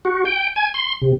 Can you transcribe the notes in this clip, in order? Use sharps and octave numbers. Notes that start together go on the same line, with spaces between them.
F#4
G5
G#5
C6
C3